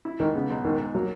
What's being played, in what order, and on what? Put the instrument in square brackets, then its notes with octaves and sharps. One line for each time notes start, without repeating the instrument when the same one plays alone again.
[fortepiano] E4
[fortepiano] G#2 [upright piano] D#3
[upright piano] C#3 [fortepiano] B3
[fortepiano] B1
[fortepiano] G#2 [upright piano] D#3
[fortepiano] G#2
[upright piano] F#3 [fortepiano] A#3